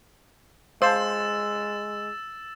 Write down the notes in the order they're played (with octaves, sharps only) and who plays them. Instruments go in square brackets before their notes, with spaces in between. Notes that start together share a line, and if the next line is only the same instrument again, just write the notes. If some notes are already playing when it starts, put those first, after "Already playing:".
[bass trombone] G#3 [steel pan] C5 [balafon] F5 A5 [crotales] E6 A6 E7